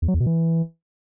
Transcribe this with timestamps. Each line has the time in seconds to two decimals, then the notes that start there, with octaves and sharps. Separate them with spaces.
0.02 E2
0.08 F#3
0.14 E2
0.20 B2
0.26 E3